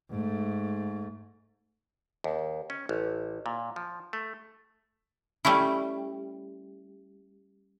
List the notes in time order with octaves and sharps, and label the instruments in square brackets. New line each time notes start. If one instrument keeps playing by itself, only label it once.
[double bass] G#2 A3
[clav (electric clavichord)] D#2
C#4
A1
A#2
F3
A3
[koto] G3 A3 C#4 E4